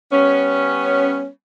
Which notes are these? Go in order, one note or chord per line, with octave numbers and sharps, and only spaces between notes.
G3 B3 C#4